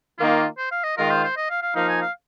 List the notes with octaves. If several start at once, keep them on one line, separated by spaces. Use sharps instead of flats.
D#3 A#3 D#4 F4
C5
F5
D#5
D#3 G#3 F4 A#4
C5
C5
D#5
F5
F5
F3 A#3 D#4 F5
G#5
F5